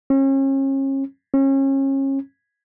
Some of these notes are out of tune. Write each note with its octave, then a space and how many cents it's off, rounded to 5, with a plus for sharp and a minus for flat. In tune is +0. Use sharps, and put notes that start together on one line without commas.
C#4 -35
C#4 -30